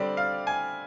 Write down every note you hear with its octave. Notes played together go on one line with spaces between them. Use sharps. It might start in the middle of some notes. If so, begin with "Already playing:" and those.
Already playing: D3 G3 C4 D5
F5
G#5